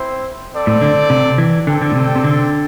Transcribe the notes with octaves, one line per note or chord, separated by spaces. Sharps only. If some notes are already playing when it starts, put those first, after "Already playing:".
Already playing: C4 E4 C5
C4 A4 D5
A2
D3
C3
E3
D3 C4 A4 D5 G5
D3
A2
C3
C3
D3